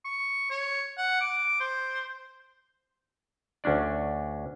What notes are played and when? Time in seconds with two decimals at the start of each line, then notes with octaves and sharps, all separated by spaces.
0.05 C#6
0.50 C#5
0.97 F#5
1.20 D6
1.60 C5
3.64 D2 C#4 D4 D5